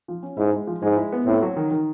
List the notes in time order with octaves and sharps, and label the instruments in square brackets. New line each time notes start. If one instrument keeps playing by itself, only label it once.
[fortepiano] F3
C#4
[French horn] G#2 [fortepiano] E4
[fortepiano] G#3
F3
[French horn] G#2 [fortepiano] G#3
[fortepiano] E4
B3
[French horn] A2 [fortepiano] C4
[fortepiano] F#3
D#3
D#3